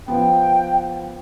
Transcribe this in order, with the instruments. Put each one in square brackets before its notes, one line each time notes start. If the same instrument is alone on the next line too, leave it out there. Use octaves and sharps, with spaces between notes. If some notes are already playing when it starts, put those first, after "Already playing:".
[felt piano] F3 B3 [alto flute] G5